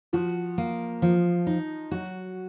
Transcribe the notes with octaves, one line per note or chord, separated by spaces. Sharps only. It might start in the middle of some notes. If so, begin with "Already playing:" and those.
F3 F#4
A#3
F3
D#4
F#3 F#4